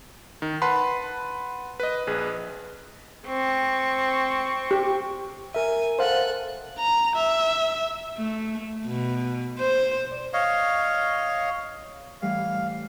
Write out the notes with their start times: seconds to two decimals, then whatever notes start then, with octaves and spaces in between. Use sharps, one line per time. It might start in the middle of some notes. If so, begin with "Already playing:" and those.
0.42 D#3
0.62 B4 F#5 A5 B5 C6
1.80 B4 D#5
2.07 A#1 G#4 B4
3.27 C4 C#6
4.71 G4
5.55 A#4 E5 G#5
5.99 A4 C5 F5 F#5 F#6
6.79 A#5
7.15 E5
8.18 A3
8.86 B2
9.59 C5
10.11 D5
10.33 C#5 D#5 F5
12.22 A2 E3 G3 F5